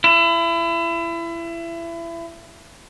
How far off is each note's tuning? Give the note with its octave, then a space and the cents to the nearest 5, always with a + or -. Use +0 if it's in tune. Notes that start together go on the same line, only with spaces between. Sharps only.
E4 +30